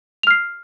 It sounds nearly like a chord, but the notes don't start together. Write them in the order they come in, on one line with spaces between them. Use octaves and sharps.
F7 F6 C7